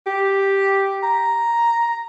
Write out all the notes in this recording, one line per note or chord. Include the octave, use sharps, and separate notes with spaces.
G4
A#5